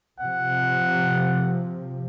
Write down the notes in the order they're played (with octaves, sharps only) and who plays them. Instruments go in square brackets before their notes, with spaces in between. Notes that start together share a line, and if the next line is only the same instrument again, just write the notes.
[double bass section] C3 F3 [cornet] F#5